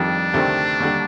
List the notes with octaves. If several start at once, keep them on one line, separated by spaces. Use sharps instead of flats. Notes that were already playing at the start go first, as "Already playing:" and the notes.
Already playing: F2 D#3 G3 D4
D2 C3 D#3 A3 C4
D#2 D3 G3